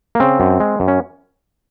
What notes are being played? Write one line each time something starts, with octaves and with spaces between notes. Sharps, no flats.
A#3
C#3 C4
F#2
G#3
F#2
C#4